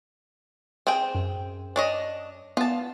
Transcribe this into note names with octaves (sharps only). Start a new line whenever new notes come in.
C4 G#4 G5
F#2
D4 C#5 D#5
B3 F4 A5